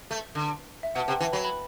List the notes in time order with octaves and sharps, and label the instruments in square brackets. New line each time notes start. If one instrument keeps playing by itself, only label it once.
[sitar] A3
D3
[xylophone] E5
[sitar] B2 [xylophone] F#5
[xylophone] A5
[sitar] C3 [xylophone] G5
[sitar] E3 [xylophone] A5
[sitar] F#3 [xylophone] B5
[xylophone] B5